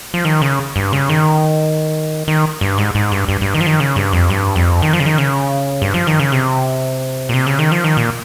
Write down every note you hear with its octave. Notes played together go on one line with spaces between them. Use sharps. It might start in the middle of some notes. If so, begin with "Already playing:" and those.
F3
D#3
C#3
G2
C#3
D#3
D#3
G2
G#2
G#2
G2
G2
G2
D#3
F3
D#3
C#3
G2
F2
G2
F2
D#3
F3
C#3
D#3
C#3
G2
F3
D#3
C#3
C3
A#2
C3
C#3
D#3
F3
D#3
A#2